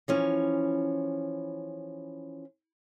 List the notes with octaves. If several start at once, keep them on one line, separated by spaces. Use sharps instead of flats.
E3 F3 C#4